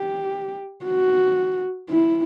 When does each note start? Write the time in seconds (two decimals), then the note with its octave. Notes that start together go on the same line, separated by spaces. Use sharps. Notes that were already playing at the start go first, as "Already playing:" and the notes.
Already playing: G4
0.85 F#4
1.90 E4